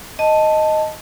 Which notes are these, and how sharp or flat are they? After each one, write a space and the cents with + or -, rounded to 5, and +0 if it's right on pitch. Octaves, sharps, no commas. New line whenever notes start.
D#5 +0 A5 +0